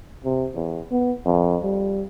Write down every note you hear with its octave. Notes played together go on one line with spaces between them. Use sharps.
C3
E2
B3
F2
G3